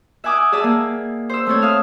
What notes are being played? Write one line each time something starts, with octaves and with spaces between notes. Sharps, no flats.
E5 F#5 G#5 D6 D#6
G#4 D5 E5 A5
A#3
C5 E6
A3 C4 A4 C#5
E5 F5 D#6 F6